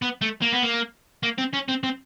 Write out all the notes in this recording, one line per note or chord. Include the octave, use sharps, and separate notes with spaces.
B3
A3
A#3
B3
A#3
A#3
C4
C#4
C4
C4